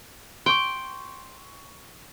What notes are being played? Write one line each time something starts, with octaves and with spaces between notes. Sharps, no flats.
G5 C6 C#6